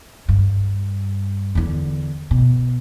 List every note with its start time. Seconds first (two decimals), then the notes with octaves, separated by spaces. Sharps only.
0.29 G2
1.55 E2 D3
2.31 B2